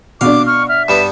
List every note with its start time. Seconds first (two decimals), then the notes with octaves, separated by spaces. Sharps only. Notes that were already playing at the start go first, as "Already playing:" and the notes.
0.21 B2 D4 F5 D6
0.46 C#6 F6
0.69 E5 F6
0.88 G2 G3 B3 E7